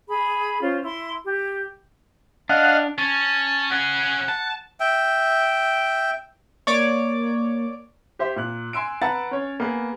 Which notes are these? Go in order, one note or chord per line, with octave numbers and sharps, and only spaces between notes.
G#4 B5
C#4 F4 C5
E4 C6
G4
D4 D#5 F5 F#5
C#4 A5
C#4 G#4 F#5
A5
E5 G5
A#3 C#5 D5 D6
G4 C5 E5
A#2 F#6
G#5 C6 E6 D7
B4 F#5 A5 A#5 E6 A6
C#4 C#5
A#3 B3 G#4